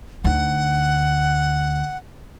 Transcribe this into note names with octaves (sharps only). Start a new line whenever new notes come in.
D2 D#4 F#5